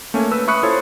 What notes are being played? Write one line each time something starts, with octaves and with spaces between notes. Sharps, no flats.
A3 A#3 C#4 G#5
B4 E6
E5 B5 C#6 D#6 F#6 C#7
E4 F4 A4 C5 C#5